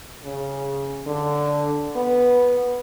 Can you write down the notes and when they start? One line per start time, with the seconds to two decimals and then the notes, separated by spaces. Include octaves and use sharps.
0.24 C#3
1.07 D3
1.96 B3